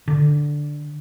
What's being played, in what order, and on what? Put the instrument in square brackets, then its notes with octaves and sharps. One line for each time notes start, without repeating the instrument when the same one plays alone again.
[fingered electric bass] D3